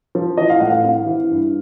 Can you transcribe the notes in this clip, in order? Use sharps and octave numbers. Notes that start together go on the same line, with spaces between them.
F3
E3 D#5
F5
A2 F#5
F5
C4 F5
E3
G2